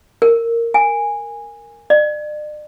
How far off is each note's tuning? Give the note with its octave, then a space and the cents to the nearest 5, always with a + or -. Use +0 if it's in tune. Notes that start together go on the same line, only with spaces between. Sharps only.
A#4 -10
G#5 -15
D5 +40